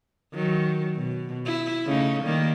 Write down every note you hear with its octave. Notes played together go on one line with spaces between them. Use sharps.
D#3 F#3
B2
E4
C#3 A3 D#4
D#3 G3 A#3